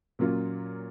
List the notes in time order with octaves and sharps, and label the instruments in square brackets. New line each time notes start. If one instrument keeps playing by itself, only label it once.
[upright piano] A#2 F#3 A#3 C#4 F4